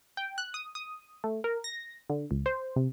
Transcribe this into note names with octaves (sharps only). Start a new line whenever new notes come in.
G5
F#6
D#6
D#6
A3
A#4
A#6
D3
C#2
C5
C3